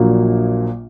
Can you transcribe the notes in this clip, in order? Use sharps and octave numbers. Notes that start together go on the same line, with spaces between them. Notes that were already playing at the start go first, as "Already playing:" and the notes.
Already playing: A#1 A#2 F#3 A#3 D4